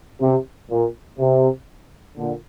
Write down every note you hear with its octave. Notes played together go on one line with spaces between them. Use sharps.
C3
A#2
C3
A#2 D3